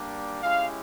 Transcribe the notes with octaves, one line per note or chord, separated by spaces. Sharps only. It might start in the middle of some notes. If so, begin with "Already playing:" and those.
Already playing: G3 A#3 D4
G#3 C#4 E4 G4 F5